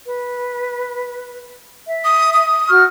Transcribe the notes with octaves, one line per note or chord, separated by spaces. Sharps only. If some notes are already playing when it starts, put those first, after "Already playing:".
B4
E5
D#6
D#6
F#4 C#6 F6